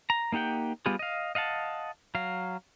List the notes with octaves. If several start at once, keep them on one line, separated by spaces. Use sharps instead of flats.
A#5
A#3 D#4 G4 F#5 G5
G3 B3 F4 G4 G#4
D#5 F5
D#5 F5 F#5 A5
F#3 F5